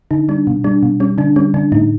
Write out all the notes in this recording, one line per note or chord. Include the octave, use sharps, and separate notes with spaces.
D3 D#4
G3 D4
B2
G3 D4
B2
G3 C#4
D3 D4
G3 C#4
D3 D4
A2 D#4